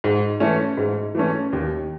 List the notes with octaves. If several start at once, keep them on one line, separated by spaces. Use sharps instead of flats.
G#2
E3 A3 C#4
G#2
E3 A3 C#4
D#2